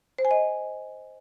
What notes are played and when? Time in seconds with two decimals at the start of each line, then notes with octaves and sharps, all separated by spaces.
0.18 C5
0.25 G#5
0.31 D#5